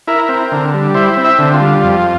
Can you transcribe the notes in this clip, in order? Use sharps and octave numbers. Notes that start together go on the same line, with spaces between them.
E4 A#4
C4
D3
G3
E4 C5
C4
E5
D3
F4
G3
F2